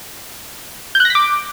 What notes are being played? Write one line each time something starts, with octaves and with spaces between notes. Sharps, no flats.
G6
F#6
A#6
B6
D6